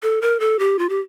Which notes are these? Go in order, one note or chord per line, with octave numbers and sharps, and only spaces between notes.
A4
A#4
A4
G4
F4
G4